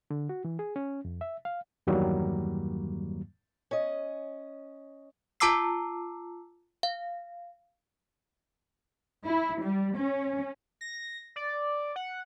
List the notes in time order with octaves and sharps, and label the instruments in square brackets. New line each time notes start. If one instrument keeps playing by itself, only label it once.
[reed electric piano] D3
F#4
E3
G#4
C#4
F2
E5
F5
E2 G2 D#3 F#3 G3 A#3
[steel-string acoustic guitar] C#4 D#5
[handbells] F4 A5 A#5 D6 E6 C7
F5
[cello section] E4
G3
C#4
[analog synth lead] A#6
D5
F#5